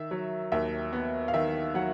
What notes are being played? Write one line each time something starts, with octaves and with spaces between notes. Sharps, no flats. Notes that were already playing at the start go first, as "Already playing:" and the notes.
Already playing: D#3 E5
F#3
D#2 E5
B3
F5
D#3 E5
F#3 F#5